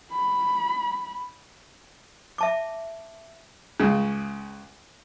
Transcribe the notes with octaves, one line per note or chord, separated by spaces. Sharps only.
B5
E5 A5 D6
C#2 C#3